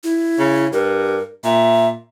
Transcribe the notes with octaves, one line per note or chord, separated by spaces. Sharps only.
E4
C#3
G2 A#4
A#2 E5